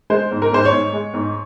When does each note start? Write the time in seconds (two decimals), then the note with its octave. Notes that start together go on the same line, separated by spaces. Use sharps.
0.10 G#3 C5
0.31 G#2
0.42 A#4
0.52 G#2 C5
0.65 C#5
0.72 G#2
0.93 G#3
1.14 G#2